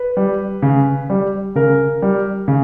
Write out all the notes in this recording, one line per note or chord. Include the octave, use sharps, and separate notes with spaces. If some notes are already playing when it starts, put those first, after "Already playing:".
Already playing: B4
G3
C#3
G3
C#3 A#4
G3
C#3